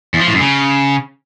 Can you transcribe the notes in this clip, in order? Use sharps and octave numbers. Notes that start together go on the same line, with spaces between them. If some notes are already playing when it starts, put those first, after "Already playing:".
E2
F3
A2
F#2
C#3